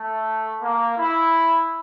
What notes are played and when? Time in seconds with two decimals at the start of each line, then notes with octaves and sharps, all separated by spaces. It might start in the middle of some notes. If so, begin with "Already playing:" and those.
Already playing: A3
0.62 A#3
0.98 E4